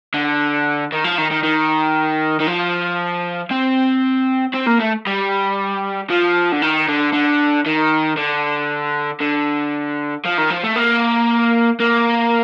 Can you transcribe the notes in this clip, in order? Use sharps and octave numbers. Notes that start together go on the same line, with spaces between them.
D3
D#3
F3
D#3
D#3
D#3
D#3
F3
C4
C4
A#3
A3
G3
F3
D3
D#3
D3
D3
D#3
D3
D3
F3
D#3
F3
A3
A#3
A#3